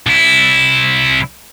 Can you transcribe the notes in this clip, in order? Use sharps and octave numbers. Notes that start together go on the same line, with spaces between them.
C2 E4